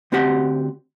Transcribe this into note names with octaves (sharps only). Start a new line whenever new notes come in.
D2 C4 F#4 G4 F#5